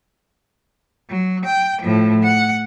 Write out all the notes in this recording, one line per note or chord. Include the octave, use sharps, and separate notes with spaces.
F#3
G5
A2 F3
F#5